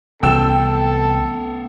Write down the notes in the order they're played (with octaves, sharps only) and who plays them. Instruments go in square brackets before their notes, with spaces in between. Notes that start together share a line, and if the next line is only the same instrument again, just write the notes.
[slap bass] C2 E3 [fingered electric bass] B3 C#4 [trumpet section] A4 [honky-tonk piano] G5 E6